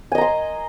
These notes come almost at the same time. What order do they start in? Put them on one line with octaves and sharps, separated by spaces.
G#5 D#5 A#5 C6